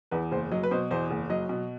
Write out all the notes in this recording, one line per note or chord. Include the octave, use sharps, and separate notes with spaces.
E2 B4
F#1 C5
F#3 D#5
B4
B2 C5
E2 C5
F#1
F#3 D#5
B2